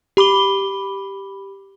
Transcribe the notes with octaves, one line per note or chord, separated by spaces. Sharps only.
G4 B5 D6 G7